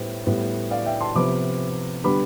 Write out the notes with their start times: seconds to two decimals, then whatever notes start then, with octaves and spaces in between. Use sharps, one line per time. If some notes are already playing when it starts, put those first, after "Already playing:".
Already playing: A2 G3 B3 C5
0.27 A2 G3 B3
0.71 D5 F5
0.86 E5 G5
1.00 A5 C6
1.15 C3 F3 B3 B5 D6
2.04 D3 G3 B3 B5 D6